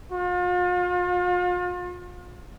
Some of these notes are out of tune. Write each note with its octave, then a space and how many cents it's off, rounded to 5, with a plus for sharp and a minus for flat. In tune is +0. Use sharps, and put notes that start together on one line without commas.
F4 +40